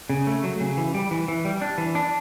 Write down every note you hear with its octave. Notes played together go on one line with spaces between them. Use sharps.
C#3
A3
F#3
C#3
E3
G3
E3
E3
G3
D4
E3
D4